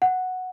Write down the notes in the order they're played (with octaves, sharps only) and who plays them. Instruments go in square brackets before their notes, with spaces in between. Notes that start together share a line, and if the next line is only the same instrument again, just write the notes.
[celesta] F#5